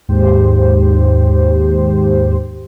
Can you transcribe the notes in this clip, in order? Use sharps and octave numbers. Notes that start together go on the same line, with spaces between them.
D#2 G#2 G4 C5